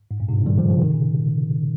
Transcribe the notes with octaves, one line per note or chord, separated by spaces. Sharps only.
G#2
G2 A#2
G#2 C3
G2 A#2
D#3 G3
C#3 F3
C#3 F3
C3 D#3
A#2 C#3